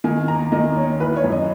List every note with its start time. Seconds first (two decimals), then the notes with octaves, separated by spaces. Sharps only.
0.04 D#3 G#5
0.28 D#2 A#5
0.52 D#3 D#5
0.76 D#2 C#5
1.00 E3 B4
1.16 C#5
1.24 F#2
1.32 D#5